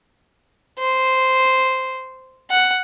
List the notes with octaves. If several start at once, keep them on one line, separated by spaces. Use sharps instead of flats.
C5
F#5